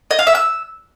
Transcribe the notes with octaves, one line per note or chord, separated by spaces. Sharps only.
D#5
F5
E5
E6